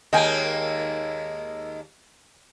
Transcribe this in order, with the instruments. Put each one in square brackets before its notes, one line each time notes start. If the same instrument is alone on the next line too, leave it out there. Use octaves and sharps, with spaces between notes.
[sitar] D#2 G#3 A#3 [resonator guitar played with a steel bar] D#5 G5 G#5